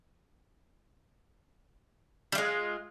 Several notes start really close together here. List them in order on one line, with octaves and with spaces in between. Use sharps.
G3 F4 G#3